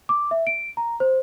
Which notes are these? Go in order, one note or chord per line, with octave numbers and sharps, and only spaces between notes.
D6
E5
D7
A#5
C5